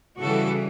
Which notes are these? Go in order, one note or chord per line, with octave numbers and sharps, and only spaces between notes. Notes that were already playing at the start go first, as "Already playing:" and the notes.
C#3 E3 G3 F#4 A4